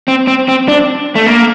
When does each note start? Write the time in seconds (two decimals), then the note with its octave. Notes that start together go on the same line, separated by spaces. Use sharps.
0.08 C4
0.27 C4
0.48 C4
0.68 D4
1.15 A3
1.26 A#3